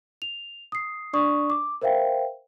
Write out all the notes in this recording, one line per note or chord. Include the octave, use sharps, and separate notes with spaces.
F7
D#6 C7
D4 D5 C#6 D#6
D6
A#4 C5 E5 F5 G5